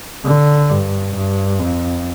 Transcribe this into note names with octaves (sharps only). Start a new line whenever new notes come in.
D3
G2
G2
F2